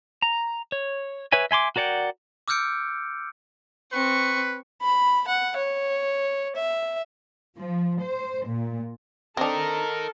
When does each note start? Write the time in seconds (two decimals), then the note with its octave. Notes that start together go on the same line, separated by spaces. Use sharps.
0.22 A#5
0.72 C#5
1.32 B4 C#5 E5 G#5
1.51 E5 G#5 C6 D6
1.76 F#4 A#4 D5 F#5 G5
2.48 D6 E6 F6 G6 C#7 D7
3.92 C4 B4 C#6
4.82 B5
5.27 F#5
5.57 C#5
6.56 E5
7.57 F3
8.01 C5
8.48 A#2
9.37 C4 D4 A4 A#4 D#5